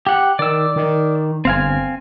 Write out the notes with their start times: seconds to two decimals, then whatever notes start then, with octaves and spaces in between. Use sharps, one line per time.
0.07 G4 F#5
0.39 D#3 D5 E6
0.76 D#3
1.45 G1 C4 F5 G#5